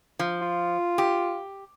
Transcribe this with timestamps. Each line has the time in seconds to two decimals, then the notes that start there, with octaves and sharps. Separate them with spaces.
0.19 F3
0.41 F4
0.98 G4